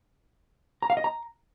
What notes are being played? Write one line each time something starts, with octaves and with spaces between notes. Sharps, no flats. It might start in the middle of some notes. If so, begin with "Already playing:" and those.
A#5
F5
D#5
A#5